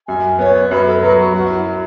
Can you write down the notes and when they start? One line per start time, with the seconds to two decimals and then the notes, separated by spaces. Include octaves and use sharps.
0.07 F#2 G#5
0.39 B3 C#5
0.70 F#2 B4
0.86 A4
1.02 F#3 B4
1.18 F#4
1.33 F#2 F#4
1.49 E4